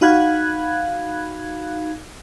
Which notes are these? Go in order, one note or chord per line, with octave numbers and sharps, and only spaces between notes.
D#4 F#4 F5 B5 F#6 G#6